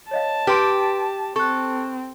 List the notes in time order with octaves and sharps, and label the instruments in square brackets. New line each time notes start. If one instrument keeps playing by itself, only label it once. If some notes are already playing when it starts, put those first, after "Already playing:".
[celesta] C#5 D#5 F5 [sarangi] A5
[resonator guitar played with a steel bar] G4 [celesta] B4 C6 D7
[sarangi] C4 [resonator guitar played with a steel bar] A4 [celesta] C#6 F#6